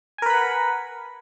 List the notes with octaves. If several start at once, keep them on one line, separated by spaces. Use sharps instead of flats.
A#4 B4 F#5 G#5 B5